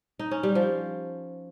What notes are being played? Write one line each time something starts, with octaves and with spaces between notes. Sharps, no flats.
D#4
C#4
G3
F3